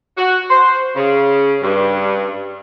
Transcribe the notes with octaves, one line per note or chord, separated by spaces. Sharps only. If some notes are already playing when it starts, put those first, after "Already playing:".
F#4
C5
C#3
G2